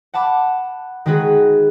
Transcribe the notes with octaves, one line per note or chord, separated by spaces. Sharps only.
F#5 A5 B5 D6
D#3 G#3 F#4 G#4 B4